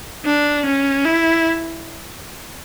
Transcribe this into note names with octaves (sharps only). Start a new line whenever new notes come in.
D4
C#4
E4